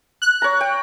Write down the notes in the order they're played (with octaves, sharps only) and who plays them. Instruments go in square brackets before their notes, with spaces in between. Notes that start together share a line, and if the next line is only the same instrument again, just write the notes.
[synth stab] F#6
[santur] C#5 A#5
G5